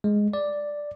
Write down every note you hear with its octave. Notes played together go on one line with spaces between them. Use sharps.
G#3
D5